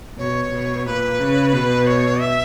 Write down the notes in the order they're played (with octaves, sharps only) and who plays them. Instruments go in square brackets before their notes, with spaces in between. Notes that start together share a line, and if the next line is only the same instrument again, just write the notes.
[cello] B2 [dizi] C#5
[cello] B2
[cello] A#2 [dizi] B4
[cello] C#3
B2
[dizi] C#5
E5